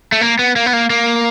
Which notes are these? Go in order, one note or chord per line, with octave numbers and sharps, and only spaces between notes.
A3
A#3
B3
A#3
B3
A#3
A#3